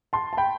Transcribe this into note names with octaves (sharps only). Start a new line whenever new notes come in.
A5 C6
A5
G5 B5